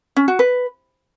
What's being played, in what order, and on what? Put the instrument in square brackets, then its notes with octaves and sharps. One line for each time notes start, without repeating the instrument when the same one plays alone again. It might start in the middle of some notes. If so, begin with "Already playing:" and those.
[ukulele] C#4
F#4
B4